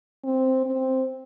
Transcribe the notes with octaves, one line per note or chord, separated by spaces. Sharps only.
C4
C4